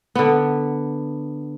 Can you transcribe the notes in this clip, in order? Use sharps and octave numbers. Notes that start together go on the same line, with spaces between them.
D3 B3